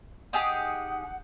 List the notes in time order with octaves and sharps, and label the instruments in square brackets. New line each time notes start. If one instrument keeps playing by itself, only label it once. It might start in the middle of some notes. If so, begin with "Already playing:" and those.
[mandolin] D#4 G4 G#4 [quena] F#5